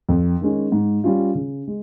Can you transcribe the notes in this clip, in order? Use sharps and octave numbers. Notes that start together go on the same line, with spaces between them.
F2
D#3 G#3 C#4
G#2
G3 C#4 F4
C#3
G#3